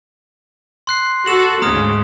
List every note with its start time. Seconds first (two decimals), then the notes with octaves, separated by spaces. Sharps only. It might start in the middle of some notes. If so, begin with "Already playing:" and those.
0.87 C6 F#6 C7
1.26 F#4 A4 E7 F#7
1.62 D2 G#2 C#3 A#5 D#6 F6